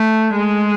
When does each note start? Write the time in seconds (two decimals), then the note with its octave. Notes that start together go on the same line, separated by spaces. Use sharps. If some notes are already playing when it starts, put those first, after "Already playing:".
Already playing: A3
0.36 G#3